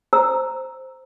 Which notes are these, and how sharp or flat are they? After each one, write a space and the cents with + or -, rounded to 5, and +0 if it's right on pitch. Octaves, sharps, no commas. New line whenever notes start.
C5 +0 A#5 +0 E6 +0